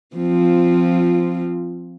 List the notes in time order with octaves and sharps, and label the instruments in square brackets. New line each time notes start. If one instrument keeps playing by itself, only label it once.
[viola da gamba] F3 C4 F4